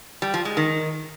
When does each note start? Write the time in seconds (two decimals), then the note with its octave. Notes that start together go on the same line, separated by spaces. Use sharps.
0.22 G3
0.34 F3
0.45 G#3
0.57 D#3